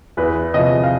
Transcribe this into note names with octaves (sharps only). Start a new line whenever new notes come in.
E2 B4
C3 F3 D#5
F5